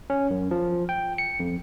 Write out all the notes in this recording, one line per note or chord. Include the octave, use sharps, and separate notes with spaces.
C#4
F#2
F3
G5
C#7
F2